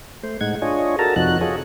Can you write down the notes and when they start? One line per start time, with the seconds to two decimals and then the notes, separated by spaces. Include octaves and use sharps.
0.23 A3 C5
0.41 A2 G#3 D#4 F#5 G#6
0.62 D4 F4 G#4 C#5 D#5
0.99 F#4 A4 A#4 A5 A#5
1.16 F2 C3 F3 D#4 F#4 F#6
1.41 F4 F#4 G#4 A4 C#5 D#5